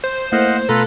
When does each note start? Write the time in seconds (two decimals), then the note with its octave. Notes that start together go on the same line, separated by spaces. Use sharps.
0.04 C5
0.32 A3 A#3 E4 D#5 F5 F#5
0.69 B2 A3 F4 A4 B4 A#5